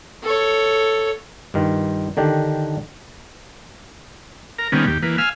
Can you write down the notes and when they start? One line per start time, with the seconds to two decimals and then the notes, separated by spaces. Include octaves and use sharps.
0.23 A4 C#5
1.54 G2 D#3 F4
2.17 D3 D#3 D4 G4
4.59 A#4 A#5
4.72 C3 D#3 G3 A#3 B3 C#4
4.87 D#2 G4
5.03 E3 A#3 B4
5.18 F5 G#5 E6 F6